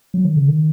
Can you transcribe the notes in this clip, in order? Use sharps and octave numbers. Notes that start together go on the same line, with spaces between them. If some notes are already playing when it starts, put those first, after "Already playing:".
F#3
D#3
C#3
D#3